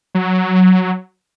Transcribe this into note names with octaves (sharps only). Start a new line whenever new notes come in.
F#3